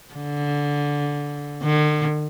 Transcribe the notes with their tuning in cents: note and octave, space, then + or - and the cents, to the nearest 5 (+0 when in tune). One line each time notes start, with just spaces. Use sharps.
D3 -15
D3 +45